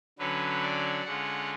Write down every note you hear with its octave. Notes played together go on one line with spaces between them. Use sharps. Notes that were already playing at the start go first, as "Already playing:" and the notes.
D3 F#3 C#4 B4
D5
D3 G#3 C#4 F4 F#5